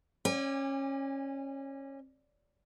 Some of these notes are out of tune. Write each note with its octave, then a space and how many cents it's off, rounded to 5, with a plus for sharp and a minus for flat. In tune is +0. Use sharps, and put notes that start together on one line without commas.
C#4 -20 D5 +5 G#5 -40